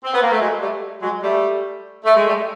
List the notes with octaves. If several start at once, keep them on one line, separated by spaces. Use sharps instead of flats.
C4
B3
A#3
A3
F#3 G#3
G3 A3
F#3 G#3
G3 A3
A3
G#3
G3 A3